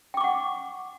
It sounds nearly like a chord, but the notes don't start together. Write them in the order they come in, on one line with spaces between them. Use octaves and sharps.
G5 D6 C#6 F#5